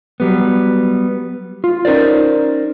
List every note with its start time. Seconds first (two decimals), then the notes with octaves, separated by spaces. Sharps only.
0.20 F#3 G3 B3
1.64 F4
1.85 C#4 D#4 A#4 C5 D5